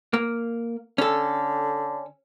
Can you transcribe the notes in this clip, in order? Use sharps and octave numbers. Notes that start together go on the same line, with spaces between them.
A#3
D3 C#4 A4